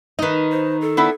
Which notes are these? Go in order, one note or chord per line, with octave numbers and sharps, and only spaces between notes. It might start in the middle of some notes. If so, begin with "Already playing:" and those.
D#3 D#4 B4 D#5
C5
A4
B3 D4 E4